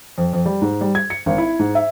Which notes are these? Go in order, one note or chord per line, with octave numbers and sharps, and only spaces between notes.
F2
F2
G3
G#2
G3
G#6
C#7
G#1
E4
G#2
E5